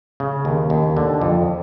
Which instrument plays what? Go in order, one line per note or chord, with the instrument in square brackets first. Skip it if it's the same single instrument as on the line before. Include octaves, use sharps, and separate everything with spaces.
[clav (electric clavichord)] C#3
D#2
D#2
D3
F2